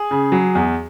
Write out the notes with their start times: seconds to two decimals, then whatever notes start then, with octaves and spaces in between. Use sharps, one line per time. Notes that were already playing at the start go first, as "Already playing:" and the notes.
Already playing: G#4
0.11 C#3
0.32 F#3
0.55 E2